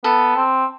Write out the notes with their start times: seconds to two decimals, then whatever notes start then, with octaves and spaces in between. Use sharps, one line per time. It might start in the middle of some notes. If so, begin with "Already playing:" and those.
0.04 B3 A4
0.36 C4